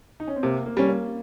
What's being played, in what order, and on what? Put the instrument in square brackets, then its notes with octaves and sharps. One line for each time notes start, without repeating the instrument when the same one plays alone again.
[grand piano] D#4
C#4
C4
[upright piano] C3 [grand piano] A#3
[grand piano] A#3
[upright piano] G3 C#4
[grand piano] A#3